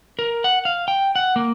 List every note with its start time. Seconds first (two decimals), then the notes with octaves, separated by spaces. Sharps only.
0.19 A#4
0.44 F#5
0.65 F5
0.88 G5
1.16 F#5
1.36 A#3